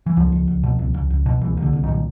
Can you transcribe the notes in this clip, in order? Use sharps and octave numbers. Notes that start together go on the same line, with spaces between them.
E3
C#2 F3
C#2
C#2
B2
C#2
C#2
C#2
B2
C2 E3
C2
D3
C2
A#2 D#3